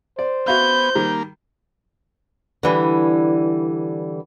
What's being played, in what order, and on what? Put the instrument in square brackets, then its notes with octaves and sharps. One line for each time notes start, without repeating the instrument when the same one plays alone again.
[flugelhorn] C5 [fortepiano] D5
[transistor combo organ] B3 [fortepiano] F#4 E5 F5 [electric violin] G6
[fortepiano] D#3 G3 [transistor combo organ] A#3
[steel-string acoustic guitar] D3 E3 G3